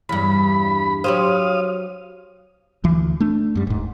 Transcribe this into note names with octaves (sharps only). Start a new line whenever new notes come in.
E2 G2 B5
F#3 G4 C5 F5 D#6
D2 E3
A3 D4
F#2 G3
D#1 G#2